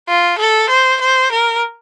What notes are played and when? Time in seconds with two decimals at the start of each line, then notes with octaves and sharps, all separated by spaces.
0.08 F4
0.38 A4
0.69 C5
1.01 C5
1.32 A#4